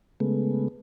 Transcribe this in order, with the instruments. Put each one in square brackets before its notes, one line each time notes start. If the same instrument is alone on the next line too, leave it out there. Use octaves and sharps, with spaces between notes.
[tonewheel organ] C#3 G#3 A3 B3